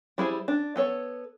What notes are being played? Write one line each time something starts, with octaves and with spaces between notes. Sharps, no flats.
G3 E4 G#4 C5
D4
B3 A4 C#5